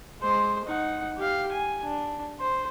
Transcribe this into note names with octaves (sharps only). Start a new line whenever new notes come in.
G#3 C5
D#4 F#5
G4 F5
G#5
D4
C5